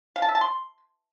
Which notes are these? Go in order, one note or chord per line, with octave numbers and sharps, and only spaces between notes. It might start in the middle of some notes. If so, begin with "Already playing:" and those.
F5
A5
E5
A5
C6